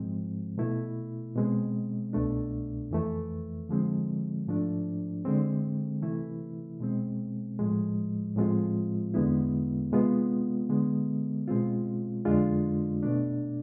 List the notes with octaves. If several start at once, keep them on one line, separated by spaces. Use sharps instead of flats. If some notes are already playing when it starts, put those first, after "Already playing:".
Already playing: G#2 F3 G#3 C4
B2 A3 E4
B2 G#3 C4
C2 B2 A3 D4
F2 E3 A3
D3 F3 G#3 C4
G#2 F3 A3 D4
D3 G#3 C4
C3 E3 A3 E4
B2 G#3 C4
A2 F3 G#3
A2 F3 G#3 C4 F4
E2 D3 G#3 B3 E4
C3 G#3 B3 F4
D3 G#3 B3
B2 G#3 C4 F4
F2 D3 G#3 D4 F4
B2 A3 D4